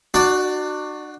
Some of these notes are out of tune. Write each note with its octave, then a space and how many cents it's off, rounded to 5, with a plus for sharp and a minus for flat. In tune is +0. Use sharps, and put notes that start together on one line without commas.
D4 +45 F#4 +0 D5 +0